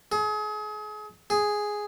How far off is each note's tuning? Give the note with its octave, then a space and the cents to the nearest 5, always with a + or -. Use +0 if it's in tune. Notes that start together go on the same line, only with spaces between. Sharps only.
G#4 +35
G#4 +0